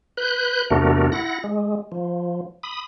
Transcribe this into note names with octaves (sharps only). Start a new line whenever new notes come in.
B4 F#6 G6
E2 C3 A3 D4 F#4 A#4
E4 F#5 A#6
G#3
F3
B5 D#6